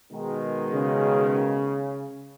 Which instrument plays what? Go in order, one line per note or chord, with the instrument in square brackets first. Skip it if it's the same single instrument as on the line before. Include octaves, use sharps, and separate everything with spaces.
[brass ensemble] B2 D#3 G#3
[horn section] C#3